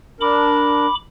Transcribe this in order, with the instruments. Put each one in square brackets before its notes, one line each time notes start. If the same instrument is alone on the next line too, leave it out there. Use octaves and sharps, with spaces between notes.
[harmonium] D4 A#4 [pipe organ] B5 D6